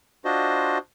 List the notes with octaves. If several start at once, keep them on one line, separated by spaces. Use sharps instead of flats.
D4 F4 F#4 C5 D#5